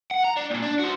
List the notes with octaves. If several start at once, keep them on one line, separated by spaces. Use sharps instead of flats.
F#5
A#5
D4
D2 A#2
D4
F#4 C5